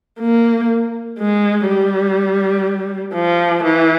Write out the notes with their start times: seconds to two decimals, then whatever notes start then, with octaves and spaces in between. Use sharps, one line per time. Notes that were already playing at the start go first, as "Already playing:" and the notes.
0.20 A#3
1.19 G#3
1.68 G3
3.15 F3
3.64 E3